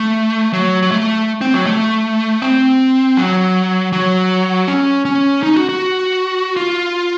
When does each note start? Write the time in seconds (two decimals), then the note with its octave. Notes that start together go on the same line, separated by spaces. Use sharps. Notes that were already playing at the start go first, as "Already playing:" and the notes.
Already playing: A3
0.53 F#3
0.82 F#3
0.92 A3
1.41 C4
1.54 F#3
1.67 A3
2.42 C4
3.17 F#3
3.93 F#3
4.68 C#4
5.05 C#4
5.43 D#4
5.56 F#4
5.69 F#4
6.56 F4